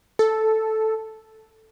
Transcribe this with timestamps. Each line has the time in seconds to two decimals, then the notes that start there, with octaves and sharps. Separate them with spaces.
0.19 A4